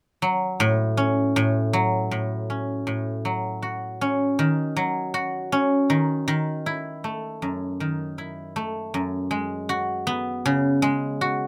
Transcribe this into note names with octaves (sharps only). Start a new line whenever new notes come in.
F#3
A2
C#4
A2
F#3
A2
C#4
A2
F#3
F#4
C#4
D#3
F#3
F#4
C#4
D#3
D#3
E4
A3
F#2
D#3
E4
A3
F#2
G#3
F#4
B3
C#3
G#3
F#4